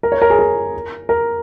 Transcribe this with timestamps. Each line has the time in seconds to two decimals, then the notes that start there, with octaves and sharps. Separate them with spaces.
0.03 A#4
0.12 C#5
0.22 A#4
0.30 G#4
0.39 A#4
1.09 A#4